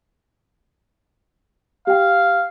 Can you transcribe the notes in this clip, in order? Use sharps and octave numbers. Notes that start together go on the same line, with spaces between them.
G4 F5 G5